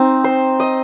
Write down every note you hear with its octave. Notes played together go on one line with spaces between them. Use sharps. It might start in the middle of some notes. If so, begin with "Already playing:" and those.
Already playing: C4 D#4
C5
D#5